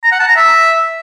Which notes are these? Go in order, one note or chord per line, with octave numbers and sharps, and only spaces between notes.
A#5
F#5
A5
A#5
E5